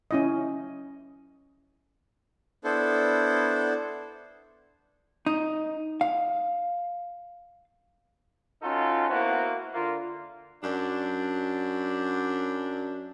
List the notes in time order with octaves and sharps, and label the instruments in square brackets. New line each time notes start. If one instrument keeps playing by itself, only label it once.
[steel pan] C#4 E4 D#5
[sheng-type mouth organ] B3 D4 E4 A4 C5
[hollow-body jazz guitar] D#4
F5
[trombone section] C#4 D#4 F4 F#4 A4
A#3 B3 E4 F#4 C5
D3 A#3 F4
[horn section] F#2 D4